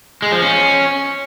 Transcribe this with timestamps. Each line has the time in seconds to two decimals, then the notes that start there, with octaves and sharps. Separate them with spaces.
0.22 G#3
0.32 F3
0.42 C#4